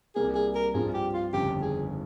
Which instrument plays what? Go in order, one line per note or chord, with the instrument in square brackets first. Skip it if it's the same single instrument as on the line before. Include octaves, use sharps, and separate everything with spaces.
[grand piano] C2 C3 G3 A#3 [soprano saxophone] G#4
[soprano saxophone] G#4
A#4
[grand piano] G2 F3 C4 F4 [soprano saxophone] G#4
[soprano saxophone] G4
F4
[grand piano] G1 F2 C#3 [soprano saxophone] G4
[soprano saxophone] G#4